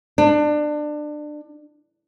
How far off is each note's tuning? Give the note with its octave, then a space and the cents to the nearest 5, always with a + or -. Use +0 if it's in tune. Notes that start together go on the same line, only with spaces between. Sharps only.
D4 +25